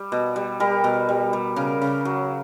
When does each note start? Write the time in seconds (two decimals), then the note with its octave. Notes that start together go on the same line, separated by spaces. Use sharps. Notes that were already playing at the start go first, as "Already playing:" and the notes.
Already playing: G3
0.12 B2
0.36 G3
0.60 G3 A#4
0.84 B2
1.09 G3
1.33 G3
1.56 C#3 A#4
1.82 C#3
2.05 F#3